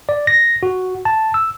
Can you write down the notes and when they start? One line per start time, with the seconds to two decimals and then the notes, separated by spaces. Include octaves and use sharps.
0.09 D5
0.27 A#6
0.63 F#4
1.05 A5
1.34 E6